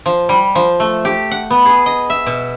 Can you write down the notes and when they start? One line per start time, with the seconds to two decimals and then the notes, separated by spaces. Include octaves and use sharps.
0.06 F3
0.29 G3
0.55 F3
0.80 A3
1.05 G4
1.31 F#5
1.51 B3
1.65 G#4
1.86 D#5
2.10 E5
2.26 B2